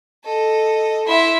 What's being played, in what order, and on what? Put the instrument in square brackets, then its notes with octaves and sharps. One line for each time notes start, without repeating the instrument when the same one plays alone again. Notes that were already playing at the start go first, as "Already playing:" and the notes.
[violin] A4 D#5
[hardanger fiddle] E4 E5 [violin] F#5 C6